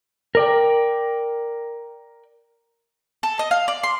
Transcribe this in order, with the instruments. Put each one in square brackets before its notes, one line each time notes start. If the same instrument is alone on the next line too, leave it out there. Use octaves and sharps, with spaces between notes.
[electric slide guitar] A#4 D5 G5
[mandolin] A4
D#5
F5
D5
C6